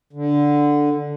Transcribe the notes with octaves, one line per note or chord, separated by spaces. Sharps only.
D3